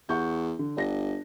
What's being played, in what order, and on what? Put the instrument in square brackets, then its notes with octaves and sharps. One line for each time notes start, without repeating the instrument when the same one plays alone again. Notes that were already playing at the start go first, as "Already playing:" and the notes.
[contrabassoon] E2 [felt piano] F#5 C#6 G6
[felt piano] D3
[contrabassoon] G1 [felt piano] D4 A#6